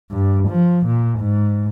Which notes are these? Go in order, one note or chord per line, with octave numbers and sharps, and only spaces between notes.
G2
F3
A#2
G#2